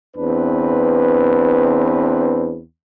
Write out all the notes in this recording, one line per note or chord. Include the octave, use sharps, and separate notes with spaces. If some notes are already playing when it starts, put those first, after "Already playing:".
E2 C4 D4 B4